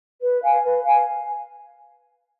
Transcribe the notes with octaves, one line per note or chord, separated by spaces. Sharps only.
B4
F5 G#5
B4
F5 G#5